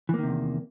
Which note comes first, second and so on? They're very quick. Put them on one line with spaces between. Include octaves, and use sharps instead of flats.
E3 A#3 D#3 C3 E2